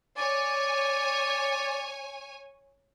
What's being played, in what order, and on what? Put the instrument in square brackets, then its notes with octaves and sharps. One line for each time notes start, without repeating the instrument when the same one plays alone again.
[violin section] C#5 G#5 [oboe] D5